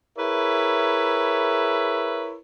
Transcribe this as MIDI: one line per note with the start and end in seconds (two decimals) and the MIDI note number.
0.18 2.36 64
0.18 2.36 68
0.18 2.36 70
0.18 2.36 71
0.18 2.36 73
0.18 2.36 76